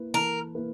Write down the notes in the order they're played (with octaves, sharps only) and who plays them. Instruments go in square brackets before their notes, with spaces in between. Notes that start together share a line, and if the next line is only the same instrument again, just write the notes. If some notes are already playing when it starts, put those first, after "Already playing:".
Already playing: [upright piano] A#3 E4 B4
[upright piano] E3 [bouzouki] A#4
[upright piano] A#3 E4 B4